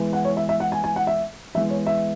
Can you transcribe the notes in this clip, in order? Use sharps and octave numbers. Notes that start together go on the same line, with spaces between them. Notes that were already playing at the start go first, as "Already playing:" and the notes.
Already playing: E3 G#3 B3
F#5
C#5
E5
E5
F#5
G#5
G#5
F#5
E5
E3 G#3 B3 E5
C#5
E5